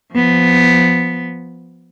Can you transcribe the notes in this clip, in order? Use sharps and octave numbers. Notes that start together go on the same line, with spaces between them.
F3 B3